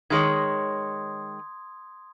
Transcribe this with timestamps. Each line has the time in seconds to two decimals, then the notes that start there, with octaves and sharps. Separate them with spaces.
0.10 D#3 G#3 C#5 C6 D#6 G#6